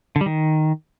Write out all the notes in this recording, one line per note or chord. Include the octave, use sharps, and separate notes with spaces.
D3
G3
D#3